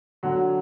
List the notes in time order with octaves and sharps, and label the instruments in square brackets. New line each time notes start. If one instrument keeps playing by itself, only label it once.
[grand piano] D3 F#3